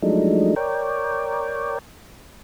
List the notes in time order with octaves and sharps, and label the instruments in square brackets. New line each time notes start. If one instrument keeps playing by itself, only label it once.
[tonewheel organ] F3 F#3 G#3 A3 D4 D#4
A#4 C#5 D5 G5